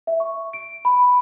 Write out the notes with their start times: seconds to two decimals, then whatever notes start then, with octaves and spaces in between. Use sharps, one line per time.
0.07 E5
0.20 C#6
0.53 D7
0.85 B5